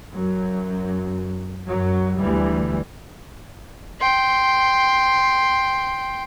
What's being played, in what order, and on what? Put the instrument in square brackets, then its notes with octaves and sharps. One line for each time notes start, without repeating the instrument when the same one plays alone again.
[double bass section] F#2 F#3
F#2 F#3
D2 E3 G3
[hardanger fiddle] G5 C6